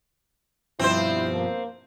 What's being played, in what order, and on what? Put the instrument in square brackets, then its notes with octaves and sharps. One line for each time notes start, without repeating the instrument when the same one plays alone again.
[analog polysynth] G2 B2 F3 [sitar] C4 C5 [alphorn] E4
[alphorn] A#3